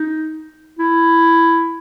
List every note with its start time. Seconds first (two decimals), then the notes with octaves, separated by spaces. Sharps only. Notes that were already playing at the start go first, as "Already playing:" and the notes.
Already playing: D#4
0.79 E4